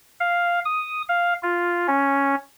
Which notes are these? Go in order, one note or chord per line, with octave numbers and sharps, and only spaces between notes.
F5
D#6
F5
F4
C#4